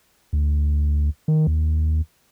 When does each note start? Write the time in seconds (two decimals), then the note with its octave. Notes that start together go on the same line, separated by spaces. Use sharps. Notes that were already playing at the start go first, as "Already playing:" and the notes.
0.33 D2
1.28 D#3
1.47 D#2